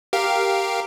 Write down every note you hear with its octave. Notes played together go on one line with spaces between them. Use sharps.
G4 A#4 F5